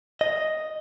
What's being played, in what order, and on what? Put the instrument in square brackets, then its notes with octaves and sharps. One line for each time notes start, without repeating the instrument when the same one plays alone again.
[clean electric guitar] D#5